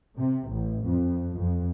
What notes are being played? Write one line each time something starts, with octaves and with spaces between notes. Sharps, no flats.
C3
A1
F2
F2